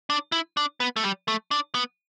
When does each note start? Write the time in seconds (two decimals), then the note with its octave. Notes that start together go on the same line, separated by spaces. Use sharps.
0.10 D4
0.32 E4
0.57 D4
0.80 B3
0.96 A3
1.04 G3
1.28 A3
1.51 D4
1.75 B3